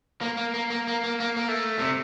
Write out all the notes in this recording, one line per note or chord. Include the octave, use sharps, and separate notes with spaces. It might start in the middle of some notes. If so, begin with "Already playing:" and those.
A#3
A#3
A#3
A#3
A#3
A#3
A#3
A#3
A3
C3